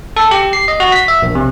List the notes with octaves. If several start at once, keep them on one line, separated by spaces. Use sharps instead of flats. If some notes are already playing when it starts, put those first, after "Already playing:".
A4
G4
C7
D#5
F#4
B6
E5
A#1
C3